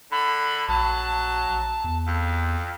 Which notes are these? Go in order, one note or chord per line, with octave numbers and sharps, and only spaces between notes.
D3 B5
A#1 F#3 A5
E2
F2